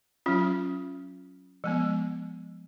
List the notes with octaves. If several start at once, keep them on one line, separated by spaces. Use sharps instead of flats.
F#3 C#4 F4
F3 G#3 B3